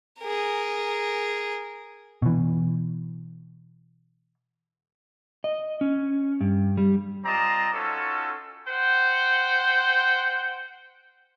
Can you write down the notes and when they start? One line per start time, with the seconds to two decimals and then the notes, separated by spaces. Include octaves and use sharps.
0.21 G#4 A#4
2.22 B2 E3
5.44 D#5
5.81 C#4
6.41 G2
6.77 G3
7.25 C4 F4 D5 D#5 A5 A#5
7.73 C#4 D#4 F4 F#4 A4
8.67 C5 F#5 G5